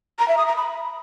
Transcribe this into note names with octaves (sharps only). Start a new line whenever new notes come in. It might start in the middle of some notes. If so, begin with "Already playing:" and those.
A#5
E5
D#6
A#5
B5